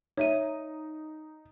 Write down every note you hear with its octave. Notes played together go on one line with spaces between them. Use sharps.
D#4 C#5 E5 D#7